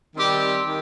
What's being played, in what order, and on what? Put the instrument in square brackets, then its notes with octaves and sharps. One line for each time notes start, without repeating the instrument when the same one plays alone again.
[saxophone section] D#3 G3 C4 G4
D#3